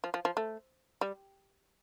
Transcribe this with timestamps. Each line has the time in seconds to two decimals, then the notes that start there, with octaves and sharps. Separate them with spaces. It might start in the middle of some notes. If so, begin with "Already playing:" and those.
0.04 F3
0.14 F3
0.25 F3
0.37 A3
1.01 G3